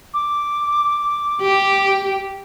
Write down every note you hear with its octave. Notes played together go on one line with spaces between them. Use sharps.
D6
G4